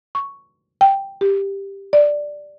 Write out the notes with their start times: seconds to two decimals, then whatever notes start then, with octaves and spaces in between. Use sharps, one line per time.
0.15 C#6
0.81 G5
1.21 G4
1.93 D5